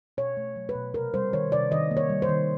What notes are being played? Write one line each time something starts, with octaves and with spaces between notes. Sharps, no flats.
B2 C#5
A3
F#3
B4
B2
C3 A#4
G3 C5
D#3 C#5
C3 D5
D#3 D#5
A#3
C#5
G3
C5
D#3